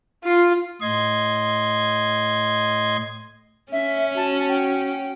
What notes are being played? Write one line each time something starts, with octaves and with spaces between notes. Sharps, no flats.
F4
A2 D#5 C6 G#6
C#4 E5
F#4 A5
G5